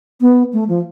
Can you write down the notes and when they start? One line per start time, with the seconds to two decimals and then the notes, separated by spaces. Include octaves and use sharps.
0.21 B3
0.53 A3
0.68 F3